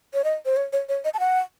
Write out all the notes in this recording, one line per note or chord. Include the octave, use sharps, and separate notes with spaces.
C#5
D#5
C5
C#5
C#5
C#5
D#5
A5
F#5